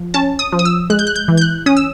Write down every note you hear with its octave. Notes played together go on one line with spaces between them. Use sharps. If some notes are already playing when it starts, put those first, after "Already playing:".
Already playing: F3
C#4 A5
D#6
F3
D#6
E6
G#3 F#6
G6
F#6
G6
E3
G6
F#6
C#4 D#6
E6